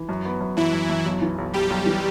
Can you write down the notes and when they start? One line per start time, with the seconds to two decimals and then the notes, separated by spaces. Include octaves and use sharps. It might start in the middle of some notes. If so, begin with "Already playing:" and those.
Already playing: E3
0.09 F#2
0.25 B3
0.41 F#2
0.57 F#2 E3 E4
0.73 F#2
0.90 F#2
1.06 B1
1.22 E3
1.38 B1
1.54 B1 G3 G4
1.70 B1
1.86 E3